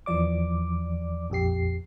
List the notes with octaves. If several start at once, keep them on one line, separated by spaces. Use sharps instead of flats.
E2 E3 F3 D5 D6
A#1 F2 G4 C7